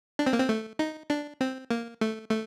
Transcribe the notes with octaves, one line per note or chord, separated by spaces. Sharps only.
D4
C4
A#3
C4
A3
D#4
D4
C4
A#3
A3
A3